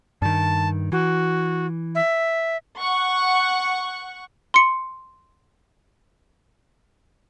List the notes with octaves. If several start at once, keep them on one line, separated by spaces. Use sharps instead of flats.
G2 D#3 A5
E3 F#4
E5
F#5 C#6
C6 C#7